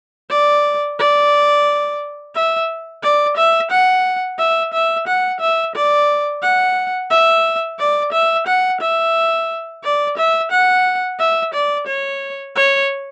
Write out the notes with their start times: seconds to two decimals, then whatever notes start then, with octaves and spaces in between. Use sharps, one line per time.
0.30 D5
0.99 D5
2.35 E5
3.03 D5
3.37 E5
3.71 F#5
4.39 E5
4.74 E5
5.08 F#5
5.40 E5
5.75 D5
6.43 F#5
7.10 E5
7.79 D5
8.13 E5
8.47 F#5
8.80 E5
9.84 D5
10.17 E5
10.51 F#5
11.19 E5
11.54 D5
11.87 C#5
12.56 C#5